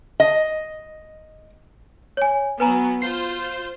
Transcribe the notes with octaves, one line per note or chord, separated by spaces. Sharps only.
D#5
C#5 G#5
F#3 B3 B4 G#5 A#5
F4 C5 C7